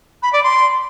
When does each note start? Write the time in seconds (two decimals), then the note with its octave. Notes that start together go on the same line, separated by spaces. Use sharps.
0.22 B5
0.33 D5
0.43 C6